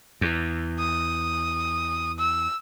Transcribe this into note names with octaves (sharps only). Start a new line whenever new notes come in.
E2
D#6
E6